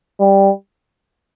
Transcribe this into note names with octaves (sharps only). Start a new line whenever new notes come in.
G3